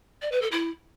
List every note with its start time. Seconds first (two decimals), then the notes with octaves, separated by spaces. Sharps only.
0.22 D5
0.32 B4
0.42 A4
0.52 E4